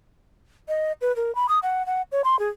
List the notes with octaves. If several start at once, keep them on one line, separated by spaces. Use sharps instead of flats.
D#5
B4
A#4
B5
D#6
F#5
F#5
C#5
C6
G#4